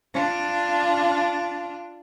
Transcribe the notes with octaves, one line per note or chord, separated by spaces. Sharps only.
D4 F4